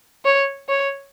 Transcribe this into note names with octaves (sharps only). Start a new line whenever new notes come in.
C#5
C#5